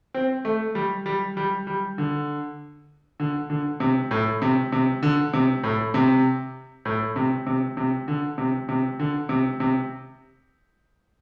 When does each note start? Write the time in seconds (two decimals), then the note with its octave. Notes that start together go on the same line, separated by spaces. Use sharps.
0.14 C4
0.45 A3
0.75 G3
1.06 G3
1.37 G3
1.67 G3
1.98 D3
3.20 D3
3.50 D3
3.80 C3
4.11 A2
4.42 C3
4.72 C3
5.03 D3
5.33 C3
5.64 A2
5.94 C3
6.85 A2
7.16 C3
7.47 C3
7.77 C3
8.08 D3
8.38 C3
8.69 C3
8.99 D3
9.29 C3
9.60 C3